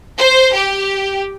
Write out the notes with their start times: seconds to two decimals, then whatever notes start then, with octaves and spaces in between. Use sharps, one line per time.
0.18 C5
0.54 G4